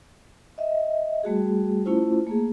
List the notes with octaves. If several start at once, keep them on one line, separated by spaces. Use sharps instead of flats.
D#5 E5
G3 A3 F#4 G#4
A3 C#4 E4 F4 C5
A3 A#3 G#4